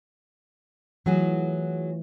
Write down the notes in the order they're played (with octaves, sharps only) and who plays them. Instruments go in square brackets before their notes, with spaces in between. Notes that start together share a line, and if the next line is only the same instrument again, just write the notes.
[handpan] E3 A3 F4 [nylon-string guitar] F#3 F#4 G#4